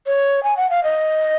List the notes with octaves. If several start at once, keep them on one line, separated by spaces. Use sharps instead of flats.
C#5
G#5
F#5
F5
D#5